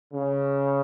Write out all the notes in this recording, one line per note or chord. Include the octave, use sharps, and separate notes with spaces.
C#3